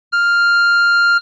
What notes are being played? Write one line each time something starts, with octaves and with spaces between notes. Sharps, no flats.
F6